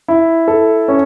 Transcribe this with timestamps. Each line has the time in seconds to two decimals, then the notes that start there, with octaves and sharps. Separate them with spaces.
0.08 E4
0.48 A4
0.88 C#4